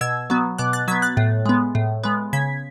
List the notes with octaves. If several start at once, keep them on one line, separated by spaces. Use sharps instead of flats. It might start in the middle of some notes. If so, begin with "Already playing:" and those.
B2 E6 G#6
F#3 B3
B2 D6 F#6
F#6 A6
F#3 B3 G#6 B6
F#6 A6
A2
G#3 B3
A2
G#3 B3
C#3 G#6 B6